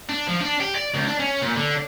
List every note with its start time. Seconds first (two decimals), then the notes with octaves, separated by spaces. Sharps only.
0.09 D4
0.28 F3
0.40 D4
0.60 G4
0.75 D5
0.95 C#2
1.08 D4
1.20 C#4
1.42 A#2
1.56 D3